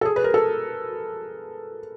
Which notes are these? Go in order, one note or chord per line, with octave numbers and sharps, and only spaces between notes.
A4
G#4
B4
A#4
A4